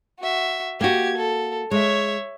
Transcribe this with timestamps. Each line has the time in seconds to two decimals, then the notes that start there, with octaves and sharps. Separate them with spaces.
0.20 F#4 E5
0.81 A#3 F#4 G4 G#6
1.17 A4
1.71 G#3 C#5 E5